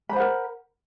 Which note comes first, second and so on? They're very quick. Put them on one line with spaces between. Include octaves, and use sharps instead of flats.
B5 C5 F#5 A#4